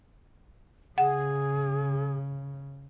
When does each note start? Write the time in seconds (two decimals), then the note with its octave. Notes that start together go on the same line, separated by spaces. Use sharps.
0.98 C#3 G#4 F#5